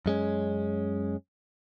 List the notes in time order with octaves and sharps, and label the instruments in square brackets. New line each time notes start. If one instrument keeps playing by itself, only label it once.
[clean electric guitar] F#2 G#3 C#4